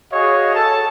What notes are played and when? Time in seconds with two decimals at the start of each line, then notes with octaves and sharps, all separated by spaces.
0.12 F#4 G#4 C#5 D#5 F5
0.55 A4 A5